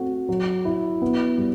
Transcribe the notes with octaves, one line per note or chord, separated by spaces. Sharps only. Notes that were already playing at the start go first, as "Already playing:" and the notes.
Already playing: A3 C4 F#4
F#3
E4
B3
G3